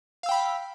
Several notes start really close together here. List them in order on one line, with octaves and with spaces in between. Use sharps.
F5 E6 G5 B5